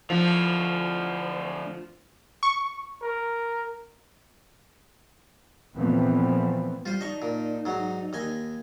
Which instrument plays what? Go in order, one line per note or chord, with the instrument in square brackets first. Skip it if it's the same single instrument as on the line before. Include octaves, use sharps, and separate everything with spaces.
[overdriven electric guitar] A2 D3 [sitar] F3
[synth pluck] C#6
[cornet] A#4
[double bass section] A#2 E3 F3 A3 B3 C4
[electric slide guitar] G3 [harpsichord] F4 C5
[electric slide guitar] D4 D#4 [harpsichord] D#5 C#6
[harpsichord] A#2
G#2 F#3
D#2 D#5 G#5